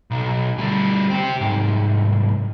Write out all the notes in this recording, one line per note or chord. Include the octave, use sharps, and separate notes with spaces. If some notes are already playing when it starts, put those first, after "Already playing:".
B1
D2 G3
C4 G4
C2 G#2